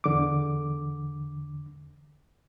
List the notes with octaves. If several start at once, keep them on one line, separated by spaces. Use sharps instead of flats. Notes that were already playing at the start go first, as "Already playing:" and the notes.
E2 D3 D6